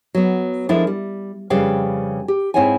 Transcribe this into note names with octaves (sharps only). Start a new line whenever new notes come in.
F#3 B3
F3 G#3 D4 E4 A4 A#4
G3
F2 C#3 G3 B4 F5 G5
G4
G#2 C4 E4 C#5 F#5 G#5